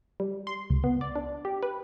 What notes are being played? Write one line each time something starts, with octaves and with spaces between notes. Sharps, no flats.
G3
C6
C#2
B3
D5
D4
G4
B4